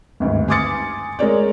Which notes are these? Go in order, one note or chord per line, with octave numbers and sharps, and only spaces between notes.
G#1 D2 G2
G#5 C6 D6 D#6 A6 C#7
G#3 A#4 C#5 D5